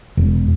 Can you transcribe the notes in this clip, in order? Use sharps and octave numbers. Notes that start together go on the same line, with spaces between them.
E1